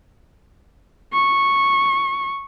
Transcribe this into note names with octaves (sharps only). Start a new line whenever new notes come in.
C#6